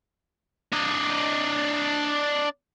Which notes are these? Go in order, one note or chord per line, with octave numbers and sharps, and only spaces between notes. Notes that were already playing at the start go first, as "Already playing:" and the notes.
D4 D#5